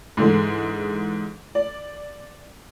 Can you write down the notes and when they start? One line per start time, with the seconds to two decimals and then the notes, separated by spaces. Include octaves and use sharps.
0.17 G#2 D3 E3 G#3
1.55 D5